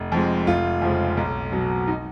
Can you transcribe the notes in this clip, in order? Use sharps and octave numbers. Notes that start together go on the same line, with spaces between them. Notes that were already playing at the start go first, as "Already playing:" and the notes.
Already playing: F1
F2 F3 G#3
F1 F4
F2 C#3 F3 G#3
B1
B2 F#3
D#4